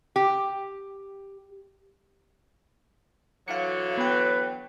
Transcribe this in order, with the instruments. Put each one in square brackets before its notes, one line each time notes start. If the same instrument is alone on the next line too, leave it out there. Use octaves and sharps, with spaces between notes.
[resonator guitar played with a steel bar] G4
[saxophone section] D3 E3 F#3 [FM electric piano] F5 C#7
[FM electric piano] B3 G5 [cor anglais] B4